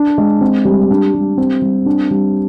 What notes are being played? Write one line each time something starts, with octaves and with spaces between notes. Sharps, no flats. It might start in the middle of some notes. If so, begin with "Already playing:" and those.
Already playing: D4
G#3
C4
G3
D4
G3
C4
G3
D4
G3